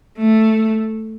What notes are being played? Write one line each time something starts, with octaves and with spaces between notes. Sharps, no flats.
A3